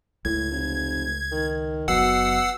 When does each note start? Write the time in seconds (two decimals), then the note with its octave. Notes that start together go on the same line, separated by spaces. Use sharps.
0.25 C#2 A2 G#6
0.51 F1
1.32 D#3
1.88 F#1 B2 F#3 F#5 E6 C7